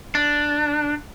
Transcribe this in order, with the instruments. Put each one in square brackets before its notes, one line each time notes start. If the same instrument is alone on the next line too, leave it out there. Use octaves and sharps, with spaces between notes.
[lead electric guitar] D4